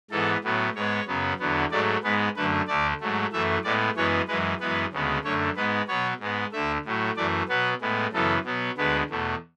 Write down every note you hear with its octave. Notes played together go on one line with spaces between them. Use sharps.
G#2 E3 B3 A4
A2 F#3 B3
G#2 G#3 B3 C#5
F#2 C#3 F#3 B3
E2 D3 F#3 B3
G#2 F#3 A3 D5
G#2 G#3 B3 B4
F#2 D3 A3 B4
D2 D3 A3 D5
G#2 F#3 A3
F#2 E3 A3 E5
A2 G#3 B3 D5
F#2 E3 G#3 B3 C#5
F#2 E3 G#3 B4
F#2 E3 G#3 B3 B4
D2 C#3 G#3 B3
F#2 D3 A3 C#5
G#2 G#3 B3 B4
B2 F#3 B3 C#5
G#2 G#3 B3
D2 D3 A3 E5
A2 F#3 A3
F#2 E3 A3 D5
B2 F#3 B3 B4
A2 G#3 B3
F#2 C#3 E3 B3 A4
B2 F#3 B3
D2 D3 G#3 B3 B4
E2 B2 A3